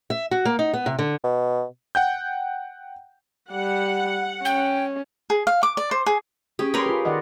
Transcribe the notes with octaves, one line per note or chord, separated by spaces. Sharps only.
E5
F#4
A#3
D#4
B3
C3
D3
B2
F#5 G5 G6
G3 F#5
C#4 G5
G#4
F5
D6
D5
C5
G#4
C#4 G4 G#4
G4 A#4 B4 C#5 B5 C6
F4 G#4
D#3 D5 D#5 F#5